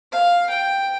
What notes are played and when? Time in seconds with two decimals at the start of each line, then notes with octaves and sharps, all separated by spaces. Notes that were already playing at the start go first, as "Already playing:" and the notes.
0.12 F5
0.50 G5